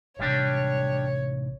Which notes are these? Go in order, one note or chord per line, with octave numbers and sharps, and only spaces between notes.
A1 C3 G3 D4 C#5